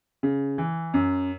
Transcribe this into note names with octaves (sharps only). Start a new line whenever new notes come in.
C#3
E3
F#2